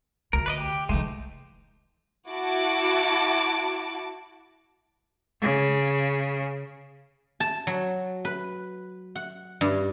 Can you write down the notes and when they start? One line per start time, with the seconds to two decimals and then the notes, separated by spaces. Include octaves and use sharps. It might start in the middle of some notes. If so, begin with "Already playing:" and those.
0.33 D2 A#4
0.46 B4 D5 D#5
0.58 G4
0.89 D#3 E3 G#3 A3 D#4
2.29 E4 F#4 A5 D6
5.42 C#3
7.40 A5
7.67 F#3
8.25 B4
9.15 F#5
9.61 G2